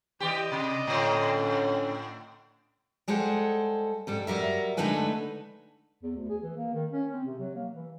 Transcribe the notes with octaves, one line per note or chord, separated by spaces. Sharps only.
E3 G4 D5 D#5
C3
A2 D3 C#4
G3 G#3 G#4 A4 C5 F#5
G#2 G3 A4
F#3 G3 A#4 E5
D3 G#3 A3 D#4 B4 G#5
E2
D2
G#4
E3
A#3
D#3
C#4
C4
C3
F#3
A#3
E3